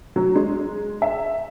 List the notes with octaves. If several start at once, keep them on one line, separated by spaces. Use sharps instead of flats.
F#3
G#3
E5